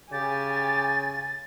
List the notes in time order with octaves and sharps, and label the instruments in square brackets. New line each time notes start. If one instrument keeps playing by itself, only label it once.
[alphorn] C#3 [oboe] G4 [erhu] G#5 [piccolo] A6